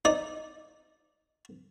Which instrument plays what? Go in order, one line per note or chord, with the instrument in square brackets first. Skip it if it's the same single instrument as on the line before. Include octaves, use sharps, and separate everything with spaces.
[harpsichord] D#4 D5